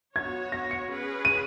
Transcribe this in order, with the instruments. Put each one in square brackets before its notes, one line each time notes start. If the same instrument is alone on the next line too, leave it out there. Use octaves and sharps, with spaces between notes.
[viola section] B3 F#4 C#5 [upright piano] G#6
[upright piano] A#6
C#7
[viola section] C#4 G#4 B4
[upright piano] D#7